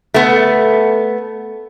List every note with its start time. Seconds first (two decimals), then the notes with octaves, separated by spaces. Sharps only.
0.14 A3 B3